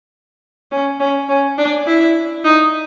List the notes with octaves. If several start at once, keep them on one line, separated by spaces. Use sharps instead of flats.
C#4
C#4
C#4
D4
E4
D#4